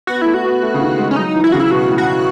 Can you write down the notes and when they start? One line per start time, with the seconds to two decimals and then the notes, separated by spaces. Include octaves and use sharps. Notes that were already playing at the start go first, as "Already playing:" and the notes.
0.07 B3 F#4
0.22 A3 E4
0.34 F#4
0.45 B3
0.62 A3
0.74 C#3
0.81 D#3
0.98 G#3
1.11 C#4
1.16 F#3 D#4
1.35 E3
1.44 E4
1.52 C#3 F#4
1.60 E4
1.71 B2 F#4
1.89 A2
1.98 F#4
2.07 A2